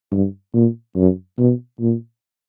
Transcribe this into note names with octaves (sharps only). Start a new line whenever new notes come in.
G2
A#2
F#2
B2
A#2